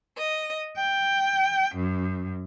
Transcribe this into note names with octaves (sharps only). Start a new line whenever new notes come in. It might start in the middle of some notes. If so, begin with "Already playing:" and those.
D#5
G5
F#2